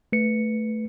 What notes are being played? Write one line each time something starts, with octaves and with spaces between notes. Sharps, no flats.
A3 B4 C#7